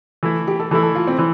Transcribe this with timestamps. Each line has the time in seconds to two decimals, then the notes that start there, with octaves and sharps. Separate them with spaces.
0.23 E3 A3 E4
0.47 G4
0.59 A4
0.71 E3 A3 E4 A4
0.83 A4
0.95 F4
1.07 C4
1.19 E3